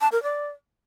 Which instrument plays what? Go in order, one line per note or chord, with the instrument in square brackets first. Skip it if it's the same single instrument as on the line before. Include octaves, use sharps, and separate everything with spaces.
[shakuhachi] A5
A#4
D5